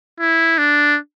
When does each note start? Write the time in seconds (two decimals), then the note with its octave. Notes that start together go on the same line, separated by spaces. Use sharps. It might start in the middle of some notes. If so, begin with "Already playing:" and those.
0.20 E4
0.58 D4